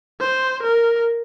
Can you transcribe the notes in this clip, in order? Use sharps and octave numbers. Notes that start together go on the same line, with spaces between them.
C5
A#4